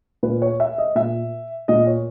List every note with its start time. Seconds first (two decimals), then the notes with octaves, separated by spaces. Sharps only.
0.23 A#2 B4
0.42 C#5
0.60 E5
0.78 D#5
0.95 A#2 E5
1.68 A#2 D#5
1.87 C#5